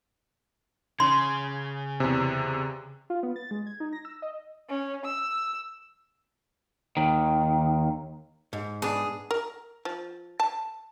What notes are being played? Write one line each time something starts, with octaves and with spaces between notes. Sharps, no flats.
C#3 C6
E2 C3
F4
B3
A6
G#3
G#6
D#4
A#6
E6
D#5
C#4
E6
D#2 D#3
G#2
B3 D4 G#4
A#4
F3
A5